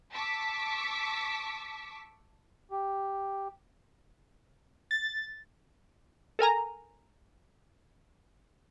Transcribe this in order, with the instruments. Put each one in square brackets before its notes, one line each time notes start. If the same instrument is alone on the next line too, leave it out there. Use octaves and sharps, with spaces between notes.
[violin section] A5 C#6 D6 E6 B6
[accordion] G4
[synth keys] A6
[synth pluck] A4 A#4 G#5 A#5